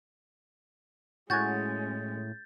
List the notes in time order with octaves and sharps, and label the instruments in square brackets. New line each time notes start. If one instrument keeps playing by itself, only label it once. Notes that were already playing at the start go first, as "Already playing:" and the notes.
[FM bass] A2 [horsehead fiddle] G#3 C#4 [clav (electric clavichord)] F#4 G#5 [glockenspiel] G6 A6